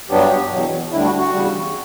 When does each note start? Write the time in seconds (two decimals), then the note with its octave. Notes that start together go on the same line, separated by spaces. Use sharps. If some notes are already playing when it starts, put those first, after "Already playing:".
0.09 G2 F#3 B3 D4 G4
0.51 E2 B2 F#3
0.92 D2 D3 G3 D4 E4
1.05 F#4
1.19 F#4
1.32 E2 C#3 G3